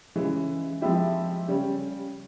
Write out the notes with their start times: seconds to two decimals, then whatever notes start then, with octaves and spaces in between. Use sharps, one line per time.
0.16 C#3 E3 G#3
0.81 F3 G#3 C4 E4 G4
1.48 C#3 G3 C#4